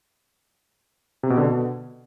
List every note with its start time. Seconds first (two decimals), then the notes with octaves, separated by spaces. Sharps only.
1.23 C3
1.30 B2
1.37 D3
1.44 B2